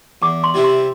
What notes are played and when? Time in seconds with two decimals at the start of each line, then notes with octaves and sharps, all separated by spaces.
0.22 E2 D6
0.44 C6
0.54 C3 G3 C4 E4
0.64 C6